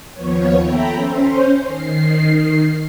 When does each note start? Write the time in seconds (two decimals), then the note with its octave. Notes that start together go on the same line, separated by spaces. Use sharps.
0.14 D#2 F3 B3 C#5
0.63 A4 E5 G5 A#5 B5
0.94 C#4 C5
1.65 D#3 C7